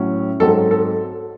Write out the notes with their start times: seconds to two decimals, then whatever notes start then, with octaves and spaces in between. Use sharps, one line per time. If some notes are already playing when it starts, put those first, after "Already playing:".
Already playing: A2 F#3 C#4
0.40 G#2 F#3 C4 A4
0.71 A4